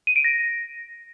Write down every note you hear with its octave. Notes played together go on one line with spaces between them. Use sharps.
D#7
D7
A#6